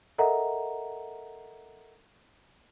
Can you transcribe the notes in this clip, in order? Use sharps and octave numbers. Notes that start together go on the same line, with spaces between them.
A4 A#4 D#5 E5 F#5 A#5